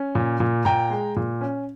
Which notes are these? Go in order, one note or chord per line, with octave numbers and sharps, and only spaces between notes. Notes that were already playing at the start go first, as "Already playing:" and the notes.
Already playing: C#4
A#2
A#2
A#2 G5 A#5
G#3
A#2
C#4